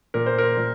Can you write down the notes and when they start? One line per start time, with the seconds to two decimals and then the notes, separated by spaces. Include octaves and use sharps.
0.14 A#2 A#4
0.26 C5
0.38 A#4
0.57 A#2